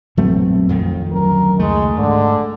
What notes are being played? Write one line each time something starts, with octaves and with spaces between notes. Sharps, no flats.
A#1 F#2 F#3 A3 B3 C4
F2 D#3
D2 F#3 C#4 A#4
C#2 D#3 G#3 A3
G#2 D3